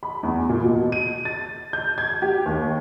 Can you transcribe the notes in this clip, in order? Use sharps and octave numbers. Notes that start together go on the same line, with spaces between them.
B5
E2
A#2
B2
D#7
A6
G6
G#6
G4
D#2